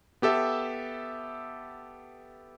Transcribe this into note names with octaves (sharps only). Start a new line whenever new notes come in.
B3 G4 A4 E5